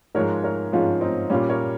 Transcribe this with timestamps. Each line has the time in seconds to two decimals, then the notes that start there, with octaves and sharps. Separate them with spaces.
0.15 G#2 F3 G#3 A#4 C#5
0.44 A#4 C#5
0.72 G#2 F3 G#3 C#4 F4
1.01 C4 D#4
1.30 A#2 G3 C#4 F4
1.50 A#4 C#5